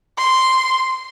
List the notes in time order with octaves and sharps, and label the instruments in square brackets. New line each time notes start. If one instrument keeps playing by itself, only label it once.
[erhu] C6